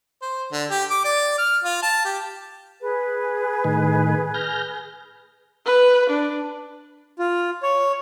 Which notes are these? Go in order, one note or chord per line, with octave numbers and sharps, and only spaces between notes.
C5
D3
G4
D6
D5
F6
F4
A5
G4
G#4 B4
A2 D#3
F6 G6 A#6
B4
D4
F4
C#5